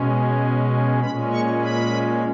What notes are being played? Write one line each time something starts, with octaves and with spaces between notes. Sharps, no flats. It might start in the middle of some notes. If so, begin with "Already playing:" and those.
Already playing: B2 G#3 C#4
A#2 G#3 C#4 B5
C#6
B5